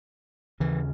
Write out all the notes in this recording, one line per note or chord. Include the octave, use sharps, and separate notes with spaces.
D#2 C#3 E3